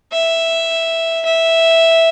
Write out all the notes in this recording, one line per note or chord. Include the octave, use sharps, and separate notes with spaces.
E5
E5